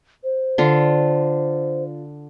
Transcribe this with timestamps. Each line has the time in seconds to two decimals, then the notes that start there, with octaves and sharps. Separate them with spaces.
0.24 C5
0.58 D3 F4